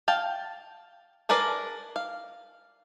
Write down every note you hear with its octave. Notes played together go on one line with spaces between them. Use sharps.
F5 G5 A5
D4 G#4 A#4 B4 D5
F5